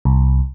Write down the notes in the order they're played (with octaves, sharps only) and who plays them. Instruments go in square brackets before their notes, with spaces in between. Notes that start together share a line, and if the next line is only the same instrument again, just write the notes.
[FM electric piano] C2